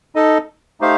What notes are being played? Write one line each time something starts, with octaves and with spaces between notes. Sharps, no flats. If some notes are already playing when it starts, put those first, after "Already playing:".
D#4 A4 D#5
A3 D#4 G4 C5 F5